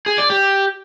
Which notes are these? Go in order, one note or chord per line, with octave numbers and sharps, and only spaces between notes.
G#4
D5
G4